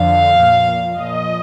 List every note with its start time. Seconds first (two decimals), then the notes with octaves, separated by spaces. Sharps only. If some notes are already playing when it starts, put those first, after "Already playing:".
Already playing: F2 D3 F3 F5
0.40 A#2 F3
0.99 A#2 F3 D#5